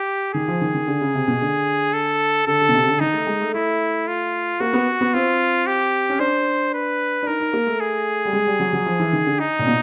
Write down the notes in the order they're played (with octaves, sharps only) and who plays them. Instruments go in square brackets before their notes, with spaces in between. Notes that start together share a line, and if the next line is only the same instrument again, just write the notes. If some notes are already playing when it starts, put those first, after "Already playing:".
Already playing: [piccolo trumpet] G4
[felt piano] D#3 [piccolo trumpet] G#4
[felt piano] F3
D#3
D#3
D3
C#3
C3
B2
D3
[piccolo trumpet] A4
[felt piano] D3 [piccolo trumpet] A4
[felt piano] D3
B2
C3
C#3
D3
[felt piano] D#3 [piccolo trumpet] D#4
[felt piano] A3
G#3
A3
[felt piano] A3 [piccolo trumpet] E4
[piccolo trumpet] F4
[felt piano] A#3 [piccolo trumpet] F#4
[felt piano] B3
B3
[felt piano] C4 [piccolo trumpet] F4
[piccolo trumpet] G4
[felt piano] C#4
[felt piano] D4 [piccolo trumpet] C5
[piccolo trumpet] B4
[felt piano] D4
[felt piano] D#4 [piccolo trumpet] A#4
[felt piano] D#4
A#3
A3
[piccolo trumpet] G#4
[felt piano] G3
G#3
G3
F#3
F#3
F3
E3
D#3
D3
[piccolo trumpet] D#4
[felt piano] A#2
B2